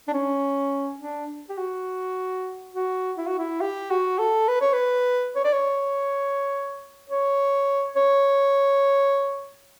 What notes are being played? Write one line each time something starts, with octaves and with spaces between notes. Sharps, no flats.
D4
C#4
D4
G4
F#4
F#4
E4
F#4
E4
G4
F#4
A4
B4
C#5
B4
C#5
D5
C#5
C#5
C#5